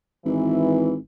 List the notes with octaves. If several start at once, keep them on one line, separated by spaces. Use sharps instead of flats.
G#1 E3